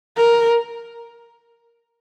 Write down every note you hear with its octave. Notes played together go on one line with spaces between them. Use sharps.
A#4